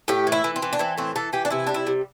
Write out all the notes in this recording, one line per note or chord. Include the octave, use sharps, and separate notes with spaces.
A2 G4
E3
E4
E3
C4
E3
D4
E3 C4
A2 C4
E3 A4
E3 G4
D4
C3 E4
G3 D4
E4
C3